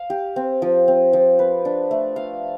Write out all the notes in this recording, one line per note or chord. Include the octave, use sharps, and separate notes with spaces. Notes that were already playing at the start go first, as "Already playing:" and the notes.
Already playing: F5
G4
C4
F3
C4
F3
B4
D4
A3
F5